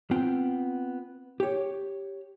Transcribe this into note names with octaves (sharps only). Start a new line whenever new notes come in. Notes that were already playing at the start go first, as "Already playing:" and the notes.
B3 C4 F4 G5
G4 C#5